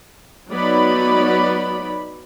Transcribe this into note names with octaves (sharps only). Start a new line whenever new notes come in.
F#3 B3 D#4 D5 B5